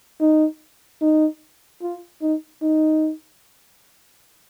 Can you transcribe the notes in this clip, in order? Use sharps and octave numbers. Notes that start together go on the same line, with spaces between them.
D#4
D#4
F4
D#4
D#4